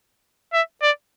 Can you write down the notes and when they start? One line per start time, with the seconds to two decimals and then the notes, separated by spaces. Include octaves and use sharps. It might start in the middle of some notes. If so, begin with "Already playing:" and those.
0.53 E5
0.82 D5